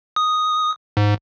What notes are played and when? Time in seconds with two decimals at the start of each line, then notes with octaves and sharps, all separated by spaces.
0.16 D#6
0.97 G#2